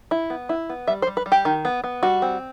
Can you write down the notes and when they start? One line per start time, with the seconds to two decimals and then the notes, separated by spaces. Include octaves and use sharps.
0.11 E4
0.30 B3
0.49 E4
0.69 B3
0.87 G3 E5
1.02 C5
1.07 G3
1.17 B4
1.26 G3
1.32 G4
1.45 D#3
1.65 B3
1.84 B3
2.03 G3 F#4
2.22 C4